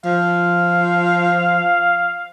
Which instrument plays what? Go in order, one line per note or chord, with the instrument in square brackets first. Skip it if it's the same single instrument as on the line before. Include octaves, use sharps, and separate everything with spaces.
[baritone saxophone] F3 [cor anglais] F5